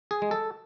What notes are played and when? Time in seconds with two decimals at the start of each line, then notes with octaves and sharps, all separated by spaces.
0.11 G#4
0.22 G#3
0.31 A4